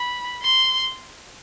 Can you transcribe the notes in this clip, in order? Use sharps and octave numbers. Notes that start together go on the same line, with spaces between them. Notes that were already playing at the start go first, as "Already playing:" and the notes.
Already playing: B5
C6